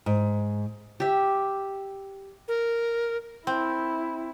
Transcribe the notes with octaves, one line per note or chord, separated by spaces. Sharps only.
G#2
G4 E5
A#4
C4 E4